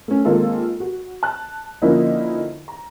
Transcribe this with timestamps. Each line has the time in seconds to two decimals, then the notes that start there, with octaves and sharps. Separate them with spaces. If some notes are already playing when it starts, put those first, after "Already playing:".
0.08 A3 C#4
0.25 D#3 G#3 A#3 C4 F4 A4
0.80 F#4
1.23 A5 F#6
1.82 D3 F3 A#3 C#4 D#4 E4
2.68 A#5